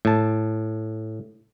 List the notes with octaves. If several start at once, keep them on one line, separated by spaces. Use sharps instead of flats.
A2 A5